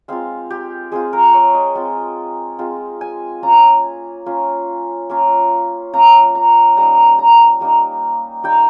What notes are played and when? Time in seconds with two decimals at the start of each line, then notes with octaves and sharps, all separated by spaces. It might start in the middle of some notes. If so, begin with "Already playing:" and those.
0.08 G#3 C4 F4 F5
0.50 G4
0.92 G#3 C4 F4 G#4
1.13 A#4
1.33 C#5
1.55 D#5
1.75 G#3 C4 F4
2.59 G#3 C4 F4
3.01 G#5
3.42 A#3 C#4 F4 A#5
4.26 A#3 C#4 F4
5.10 A#3 C#4 F4
5.93 A#3 C#4 F4 A#5
6.35 A#5
6.77 G3 A#3 D#4 A#5
7.19 A#5
7.60 G3 A#3 D#4
8.44 G3 A#3 D#4 G5